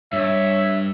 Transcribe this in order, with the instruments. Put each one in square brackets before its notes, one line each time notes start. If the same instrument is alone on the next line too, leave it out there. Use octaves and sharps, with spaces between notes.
[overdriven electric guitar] G2 [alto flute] C#5 [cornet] E5